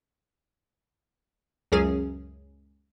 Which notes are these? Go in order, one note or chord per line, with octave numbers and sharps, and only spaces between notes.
C#2 F#2 F#3 C#4 G#4